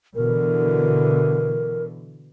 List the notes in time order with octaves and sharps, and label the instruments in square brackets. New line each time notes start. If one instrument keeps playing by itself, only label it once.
[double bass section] B2 D3 E3 [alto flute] A#4